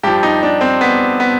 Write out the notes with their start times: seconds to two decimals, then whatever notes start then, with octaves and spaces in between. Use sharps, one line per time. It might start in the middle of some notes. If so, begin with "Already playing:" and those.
0.03 G2 F3 G4
0.23 D#4
0.43 D4
0.61 C4
0.81 B3
1.20 B3